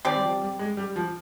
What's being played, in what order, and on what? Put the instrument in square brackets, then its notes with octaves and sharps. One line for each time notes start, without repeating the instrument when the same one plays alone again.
[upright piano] D#3 [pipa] C4 G4 D5
[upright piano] G3
F3
G3
G#3
G3
F3